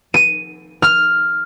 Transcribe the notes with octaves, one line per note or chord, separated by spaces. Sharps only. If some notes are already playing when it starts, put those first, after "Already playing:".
D#7
F6